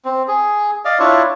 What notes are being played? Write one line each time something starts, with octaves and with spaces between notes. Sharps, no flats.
C4
G#4
D5 D#5 F5
D4 E4 F4 C#5